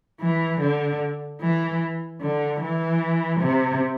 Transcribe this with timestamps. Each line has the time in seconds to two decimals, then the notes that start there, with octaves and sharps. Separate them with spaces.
0.21 E3
0.61 D3
1.40 E3
2.21 D3
2.61 E3
3.40 C3